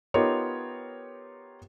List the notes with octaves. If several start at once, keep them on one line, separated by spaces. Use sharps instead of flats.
B3 D#4 F4 G4 A#4 C#5